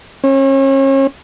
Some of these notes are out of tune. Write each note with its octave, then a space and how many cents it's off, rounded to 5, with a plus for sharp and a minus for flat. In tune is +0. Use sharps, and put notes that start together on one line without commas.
C#4 -35